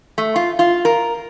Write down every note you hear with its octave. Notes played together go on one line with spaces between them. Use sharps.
A3
F4
F4
A#4